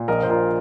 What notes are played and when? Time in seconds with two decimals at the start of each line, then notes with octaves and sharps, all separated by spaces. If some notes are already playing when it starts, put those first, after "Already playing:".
Already playing: A#2
0.08 A#1 A#4 D#5
0.23 A#2 C5
0.30 F4 A#4